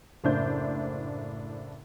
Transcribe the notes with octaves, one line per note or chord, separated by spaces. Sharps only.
F#1 A2 D4 C5 G6